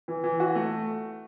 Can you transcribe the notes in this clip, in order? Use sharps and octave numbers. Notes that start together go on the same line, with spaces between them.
E3
E3
F#4
A3